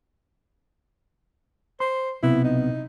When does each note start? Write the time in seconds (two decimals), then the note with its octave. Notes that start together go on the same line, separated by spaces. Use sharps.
1.80 C5 C6
2.23 B1 C3 B3 E4
2.44 D#4